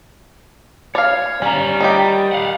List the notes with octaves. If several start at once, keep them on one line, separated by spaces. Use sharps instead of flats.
C#5 D5 F5
G3 C#4 A#5
D#3 D#4 G4
F5 F#5